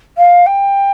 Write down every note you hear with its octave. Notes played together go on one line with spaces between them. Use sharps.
F5
G5